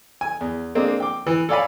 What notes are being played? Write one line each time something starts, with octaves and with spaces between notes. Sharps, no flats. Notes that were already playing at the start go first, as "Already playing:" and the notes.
G#5
E2
G#3 A#3 C4 D4
G5 D6
E3
A4 C#5 D5 F5 G#5 B5